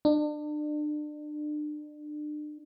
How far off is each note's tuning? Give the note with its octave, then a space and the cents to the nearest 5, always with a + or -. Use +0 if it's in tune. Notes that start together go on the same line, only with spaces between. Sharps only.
D4 +35